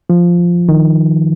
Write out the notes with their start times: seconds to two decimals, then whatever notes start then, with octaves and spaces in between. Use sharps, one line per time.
0.10 F3
0.69 D#3